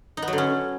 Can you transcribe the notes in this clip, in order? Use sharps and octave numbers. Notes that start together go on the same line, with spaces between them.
D#4
B3
F#3
D3
C#4